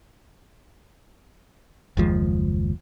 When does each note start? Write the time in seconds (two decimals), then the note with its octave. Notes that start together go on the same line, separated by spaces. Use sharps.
1.97 F#1 D#2 F3 G#3